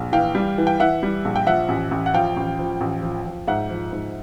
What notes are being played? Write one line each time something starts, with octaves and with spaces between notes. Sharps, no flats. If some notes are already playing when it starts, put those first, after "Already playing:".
Already playing: A#1
E3 F5 G5
G3
E3
G5
E3 E5 F#5
G3
A#1
G5
F3 E5 F#5
A1
A1
F#5
F3 F5 G5
A1
F3
A1
F3
F3
G#2 E5 F#5
F3
G#2